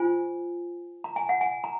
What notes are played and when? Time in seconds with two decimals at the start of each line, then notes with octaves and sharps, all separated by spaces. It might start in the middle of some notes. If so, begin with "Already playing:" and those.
Already playing: F4 C5 G#5
1.04 A#5
1.16 G#5
1.29 F#5
1.41 G#5
1.64 A#5